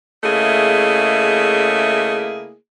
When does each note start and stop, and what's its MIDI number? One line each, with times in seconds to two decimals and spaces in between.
0.23 2.54 49
0.23 2.54 57
0.23 2.54 58
0.23 2.54 64
0.23 2.54 68
0.23 2.54 75